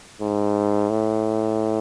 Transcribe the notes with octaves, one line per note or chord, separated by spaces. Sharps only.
G#2
A2